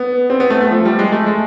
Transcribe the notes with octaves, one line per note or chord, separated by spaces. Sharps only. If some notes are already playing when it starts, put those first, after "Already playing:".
Already playing: B3
C4
B3
A3
A3
F3
G3
G#3
A3
G#3